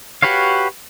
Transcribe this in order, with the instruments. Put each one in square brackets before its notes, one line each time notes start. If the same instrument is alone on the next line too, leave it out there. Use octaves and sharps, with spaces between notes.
[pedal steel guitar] F#4 G4 B4 C#5 F5